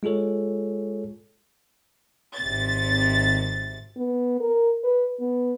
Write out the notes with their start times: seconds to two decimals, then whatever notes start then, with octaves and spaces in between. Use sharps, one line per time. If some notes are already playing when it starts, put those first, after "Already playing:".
0.03 G#3 F4 G#4 A4 C#5
2.36 G#1 C3 A6
3.97 B3
4.40 A#4
4.84 B4
5.21 B3